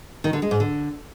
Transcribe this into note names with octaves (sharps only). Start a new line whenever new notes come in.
D#3
D3
G#3
G#2
D3